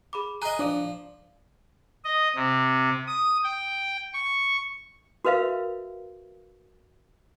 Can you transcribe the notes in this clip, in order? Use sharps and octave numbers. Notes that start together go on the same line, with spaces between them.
G#4 B5 D6
G#4 D#5 A#5 F#6 G7
F3 D4 D5
D#5
C3
D#6
G5
C#6
F#4 A#4 B4 E5 F5